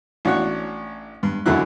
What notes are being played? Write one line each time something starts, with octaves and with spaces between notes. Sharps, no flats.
A1 D4 F#4 C#5 F#5 C#6
G2
C#2 F#2 D3 F#3 E4 F#6